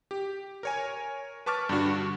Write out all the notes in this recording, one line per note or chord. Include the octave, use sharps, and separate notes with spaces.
G4
A#4 C#5 G#5
B4 A5 C#6 D6 F6 A6
G2 D3 D4 F#4